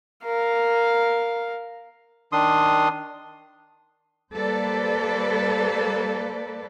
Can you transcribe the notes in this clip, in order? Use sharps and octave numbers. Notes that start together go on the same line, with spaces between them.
A#4 F5
D#3 D4 C6 D#6
G3 A#3 A4 B4 C5 D5